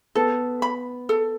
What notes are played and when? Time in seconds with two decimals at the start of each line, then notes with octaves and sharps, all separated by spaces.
0.15 B3 A4
0.62 B5
1.09 A4